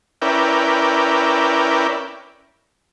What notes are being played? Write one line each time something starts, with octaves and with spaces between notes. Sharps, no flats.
C#4 E4 A#4 B4 D5 G5